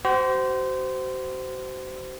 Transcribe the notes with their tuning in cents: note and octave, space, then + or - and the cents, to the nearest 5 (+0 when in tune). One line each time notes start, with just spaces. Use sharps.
F#4 +40 C5 -20